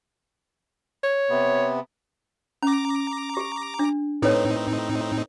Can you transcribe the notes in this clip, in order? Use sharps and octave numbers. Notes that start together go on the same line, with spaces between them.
C#5
C3 B3
C#4 A#5 D6
G4
D4
A2 C4 D#4 A4 B4 C#5